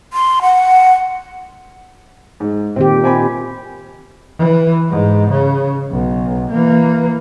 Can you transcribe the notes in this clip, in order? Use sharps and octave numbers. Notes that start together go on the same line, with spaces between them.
C6
F#5
G#2
A#2 D#3 C4 G4
C4 G#5 B5
E3
G#2
C#3
B1
E3 A#3